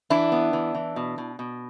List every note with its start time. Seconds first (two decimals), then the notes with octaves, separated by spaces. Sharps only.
0.10 E3 D4 E4
0.32 B3
0.53 E3
0.75 E3
0.96 B2
1.18 B2
1.39 B2